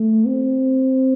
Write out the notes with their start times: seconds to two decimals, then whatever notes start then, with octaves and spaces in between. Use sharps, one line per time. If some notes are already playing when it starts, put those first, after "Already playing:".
Already playing: A3
0.26 C4